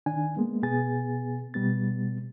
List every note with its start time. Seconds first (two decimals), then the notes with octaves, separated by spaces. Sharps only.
0.06 D#3 D4 G#5
0.36 G#3 A#3 B3
0.63 B2 B3 G#4 G#5 A6
1.54 B2 G3 B3 A6